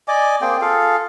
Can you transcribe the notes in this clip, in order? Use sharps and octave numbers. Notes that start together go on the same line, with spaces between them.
D5 D#5 G#5 D6
A#3 C4 G#4 G5
F4 G#4 A4 F5